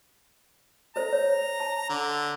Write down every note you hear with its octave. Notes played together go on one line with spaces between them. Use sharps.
A4 C5 A#5
C#5
A5
D3